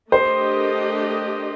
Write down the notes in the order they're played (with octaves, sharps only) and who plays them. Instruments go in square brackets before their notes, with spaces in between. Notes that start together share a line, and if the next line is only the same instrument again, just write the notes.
[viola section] A3 D4 G4 A#4 D#5 [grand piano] C5